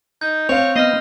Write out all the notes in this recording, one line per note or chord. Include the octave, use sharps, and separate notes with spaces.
D#4 G6
C4 C#5 F5 F7
B3 D#5 F6 A#6 C7